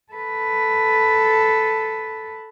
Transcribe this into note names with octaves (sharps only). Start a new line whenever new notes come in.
A4 B4